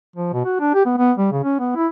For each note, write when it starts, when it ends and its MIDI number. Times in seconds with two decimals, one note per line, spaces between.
0.16 0.31 53
0.33 0.43 47
0.45 0.58 66
0.60 0.74 62
0.74 0.86 67
0.86 0.97 59
0.97 1.12 59
1.18 1.30 55
1.32 1.42 49
1.44 1.58 61
1.59 1.73 59
1.76 1.88 64